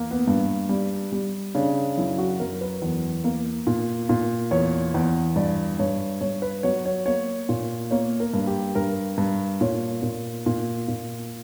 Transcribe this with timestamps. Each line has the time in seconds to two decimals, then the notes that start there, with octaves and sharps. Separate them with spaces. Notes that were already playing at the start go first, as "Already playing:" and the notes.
Already playing: E2 A#3
0.11 B3
0.28 G2
0.69 G3
1.12 G3
1.55 C#3 D4
1.98 F#2 E4
2.18 F#4
2.40 F#2 A#4
2.61 B4
2.82 E2
3.24 A#3
3.67 A#2
4.09 A#2
4.51 E2 C#5
4.94 E2
5.36 G2 D5
5.79 G2 C#5
6.21 G2 C#5
6.42 B4
6.63 F#3 C#5
6.85 C#5
7.06 A#3 C#5
7.49 A#2
7.91 A#3 C#5
8.20 A#4
8.34 G2
8.47 G4
8.75 G2 A#4
9.18 G2
9.61 A#2 C#5
10.03 A#2
10.46 A#2
10.88 A#2